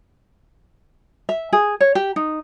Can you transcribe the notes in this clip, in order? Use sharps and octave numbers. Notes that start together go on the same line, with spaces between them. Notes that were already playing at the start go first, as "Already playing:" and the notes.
E5
G#4
C#5
G4
D#4